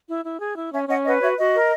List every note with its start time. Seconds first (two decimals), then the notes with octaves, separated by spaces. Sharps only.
0.09 E4
0.25 E4
0.41 G#4
0.57 E4
0.73 C#4 E5 G#5
0.89 C#4 D#5 F#5
1.06 B4 D#5 F#5
1.22 F#4 C#5 E5
1.38 F#4 D#5
1.54 A#4